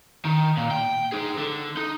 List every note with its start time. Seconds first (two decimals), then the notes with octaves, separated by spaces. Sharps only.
0.25 D#3
0.57 A#2
0.71 G5
1.12 D#4 G#4
1.38 D3
1.77 D#4